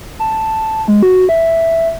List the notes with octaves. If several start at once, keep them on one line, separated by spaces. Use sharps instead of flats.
A5
G#3
F#4
E5